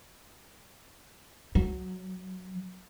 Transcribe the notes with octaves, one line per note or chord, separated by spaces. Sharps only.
F#3